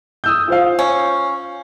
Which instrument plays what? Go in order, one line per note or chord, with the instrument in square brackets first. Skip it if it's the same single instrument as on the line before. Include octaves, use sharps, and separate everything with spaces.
[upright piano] D#6 E6 G6
F4 C5 F5
[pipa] C#4